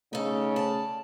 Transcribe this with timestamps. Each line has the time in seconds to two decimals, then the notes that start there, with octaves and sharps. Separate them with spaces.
0.13 C#3 A3 D#4 A4
0.56 D5 A5